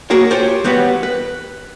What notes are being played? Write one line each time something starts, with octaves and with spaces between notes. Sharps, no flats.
A#3 F#4 G#4 A#4 C#5
F4 G4 C5 C#5
E3 G3 B3 F#4 B4 C#5
B4